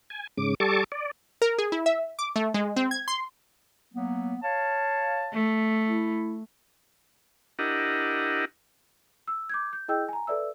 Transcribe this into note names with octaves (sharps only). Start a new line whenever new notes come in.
G#5
G#2 C#3 D6
G3 A4 A5 C#6 D6
D5
A#4
G#4
E4
E5
D6
A3
G#3
C4
G#6
C6
F#3 A#3 B3
C#5 F5 A5
A3
E4
D4 E4 G4 A#4 D#5 F#5
E6
D6 G6 G#6
G6
E4 G#4 D#5 G5 E6 G6
G#5 A#5
A4 B4 D5 E5 E6